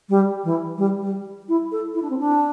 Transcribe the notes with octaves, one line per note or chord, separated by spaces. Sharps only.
G3
E3
G3
G3
E4
A4
E4
D4
C4
D4